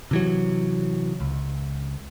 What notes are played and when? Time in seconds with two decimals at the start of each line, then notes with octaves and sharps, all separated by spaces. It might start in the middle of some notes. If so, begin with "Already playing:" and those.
0.11 C3 E3 F#3
1.21 C#2